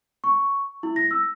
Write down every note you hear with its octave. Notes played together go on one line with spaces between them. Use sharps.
C#6
E4
A#6
E6